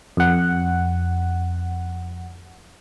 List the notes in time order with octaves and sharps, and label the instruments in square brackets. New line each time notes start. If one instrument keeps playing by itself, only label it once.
[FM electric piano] F2 F#5